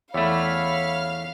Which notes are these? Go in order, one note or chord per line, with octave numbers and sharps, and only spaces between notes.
E2 A3 C#5 E5 F5 B5 F6